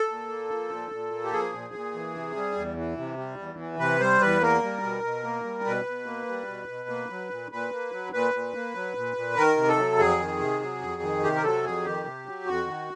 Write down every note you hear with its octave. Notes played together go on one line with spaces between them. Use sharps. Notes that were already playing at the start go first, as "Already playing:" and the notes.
Already playing: A4
A#2
A#3
F3
A#2
A#2
A#3
G4
F3 G#4
A#2
A#2
E3
C3
G3
E2
E3
C3
G3
E2
E3
C3 B4
G3 C5
E2 B4
A#3 A#4
G3
B2
B2
A#3
G3
B2 B4
B2
A#3
G3
B2
B2
A#3
F#3
A#2
A#2 B4
A#3
F#3
A#2 B4
A#2
A#3
F#3
A#2
A#2
D#3 A#4
C3
A4
F#3
F2 G#4
D#3
C3
F#3
F2
D#3
C3 G4
A#4
F#3 A4
F2 G#4
D#3 G4
C3
F#3
F2 F#4
D#3